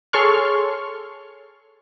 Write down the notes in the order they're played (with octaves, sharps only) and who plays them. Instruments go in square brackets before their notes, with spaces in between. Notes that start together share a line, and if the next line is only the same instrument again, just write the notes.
[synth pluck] G#4 A4 C#5 C6 C#6 F6